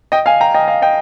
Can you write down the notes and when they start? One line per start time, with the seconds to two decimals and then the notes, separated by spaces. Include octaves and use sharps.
0.12 D#5 G5
0.26 F5 G#5
0.40 G5 A#5
0.54 D#5 G5
0.68 F5
0.82 D#5 G5